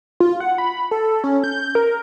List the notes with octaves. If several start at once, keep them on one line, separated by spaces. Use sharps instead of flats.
F4
F#5
B5
A4
C#4
G6
A#4